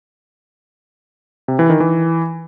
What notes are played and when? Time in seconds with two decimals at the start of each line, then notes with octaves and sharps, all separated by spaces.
1.48 C3
1.59 E3
1.70 D#3
1.80 E3